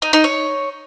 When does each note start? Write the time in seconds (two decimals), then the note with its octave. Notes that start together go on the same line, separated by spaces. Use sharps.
0.02 D#4
0.13 D#4
0.24 C#5